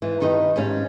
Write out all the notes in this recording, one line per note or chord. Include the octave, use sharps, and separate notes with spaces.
G#2 E3
G2 D#3 D#4 B4 D#5
G#2 G3 C#4 F5